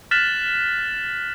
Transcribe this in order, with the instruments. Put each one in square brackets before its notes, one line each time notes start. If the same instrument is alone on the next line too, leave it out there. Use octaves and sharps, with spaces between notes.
[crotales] F6 F#6 A6 B6 E7 F#7